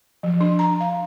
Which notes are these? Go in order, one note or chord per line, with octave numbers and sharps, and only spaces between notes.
F3
D4
A#5
F5